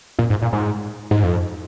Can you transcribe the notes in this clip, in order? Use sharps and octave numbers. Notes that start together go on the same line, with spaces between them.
A#2
G#2
A#2
G#2
G#2
F2